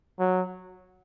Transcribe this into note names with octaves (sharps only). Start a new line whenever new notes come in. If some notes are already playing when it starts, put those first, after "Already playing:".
F#3